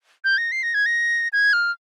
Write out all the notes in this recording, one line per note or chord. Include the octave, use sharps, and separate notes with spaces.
G6
A#6
C7
A#6
G#6
A#6
G#6
F6